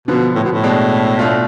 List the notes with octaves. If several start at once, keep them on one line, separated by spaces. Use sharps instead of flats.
B2 D3 F3 B3
A2
B2
A2
B2 G#3 D4
B2 A3 D4 F4